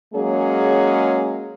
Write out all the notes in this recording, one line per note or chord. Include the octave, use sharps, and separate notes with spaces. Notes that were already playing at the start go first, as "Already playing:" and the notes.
F#3 G#3 A#3 C#4 G#4